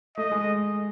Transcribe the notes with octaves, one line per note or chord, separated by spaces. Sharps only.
A3 D#5
G#3